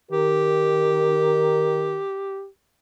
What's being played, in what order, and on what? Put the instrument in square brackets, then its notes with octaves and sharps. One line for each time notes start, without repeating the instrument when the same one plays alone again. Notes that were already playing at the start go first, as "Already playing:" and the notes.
[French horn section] D#3 A#4 [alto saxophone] G4